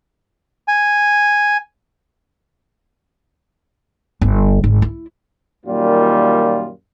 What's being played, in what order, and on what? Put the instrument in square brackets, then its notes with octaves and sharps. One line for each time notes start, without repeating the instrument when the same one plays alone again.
[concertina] G#5
[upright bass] G1
G#1
E4
[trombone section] F#2 A#2 D#3 G3 A#3 F4